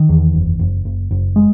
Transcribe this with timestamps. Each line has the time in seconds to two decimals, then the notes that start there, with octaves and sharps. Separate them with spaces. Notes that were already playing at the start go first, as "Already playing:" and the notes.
Already playing: D#3
0.09 E2
0.34 F#1
0.59 F#1
0.85 F#1
1.11 F#1
1.36 G#3